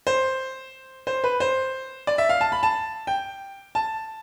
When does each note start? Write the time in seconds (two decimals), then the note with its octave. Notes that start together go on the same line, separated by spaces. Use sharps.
0.07 C5
1.07 C5
1.24 B4
1.40 C5
2.07 D5
2.18 E5
2.29 F5
2.41 A5
2.52 B5
2.63 A5
3.07 G5
3.75 A5